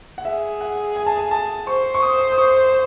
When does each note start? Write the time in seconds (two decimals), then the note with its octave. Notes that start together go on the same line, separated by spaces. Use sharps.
0.18 F#5
0.25 G#4 E5
0.61 F#5
0.96 G#5
1.06 A5
1.18 G#5
1.31 A5
1.67 C5 C#6
1.95 C#6
2.02 D#6
2.32 D#6
2.38 C#6